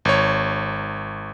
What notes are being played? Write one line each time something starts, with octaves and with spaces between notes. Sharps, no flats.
G#1 C#5